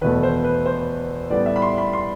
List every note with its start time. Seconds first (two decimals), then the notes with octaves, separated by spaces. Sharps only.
0.01 E2 B2 A3 B4
0.23 C5
0.44 B4
0.66 C5
1.30 A2 G3 B3 D5
1.46 E5
1.56 B5
1.62 C6
1.78 B5
1.93 C6